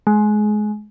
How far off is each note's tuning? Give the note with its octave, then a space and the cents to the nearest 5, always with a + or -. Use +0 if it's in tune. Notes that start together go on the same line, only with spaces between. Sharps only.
G#3 +25